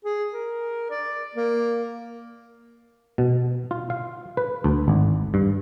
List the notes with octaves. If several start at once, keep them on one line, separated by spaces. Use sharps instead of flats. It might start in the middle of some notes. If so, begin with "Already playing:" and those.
G#4
A#4
D5
A#3
B2
F4
F5
B4
D2
G#1
G2